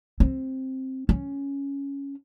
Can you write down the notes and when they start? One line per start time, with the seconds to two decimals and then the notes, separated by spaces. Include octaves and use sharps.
0.20 C4
1.09 C#4